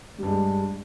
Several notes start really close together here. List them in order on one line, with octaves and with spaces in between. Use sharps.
G3 G2 G#3